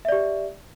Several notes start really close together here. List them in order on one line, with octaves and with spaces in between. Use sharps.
E5 D5 G4